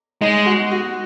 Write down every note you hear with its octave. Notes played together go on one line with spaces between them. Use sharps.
G#3 D#4
F#4
F#4